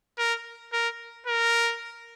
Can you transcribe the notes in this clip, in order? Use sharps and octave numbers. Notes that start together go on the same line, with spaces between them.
A#4
A#4
A#4